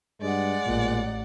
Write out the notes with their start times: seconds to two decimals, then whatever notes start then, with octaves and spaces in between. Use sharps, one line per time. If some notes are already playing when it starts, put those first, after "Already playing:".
0.22 G2 G#3 D5 F#5
0.66 A1 A#2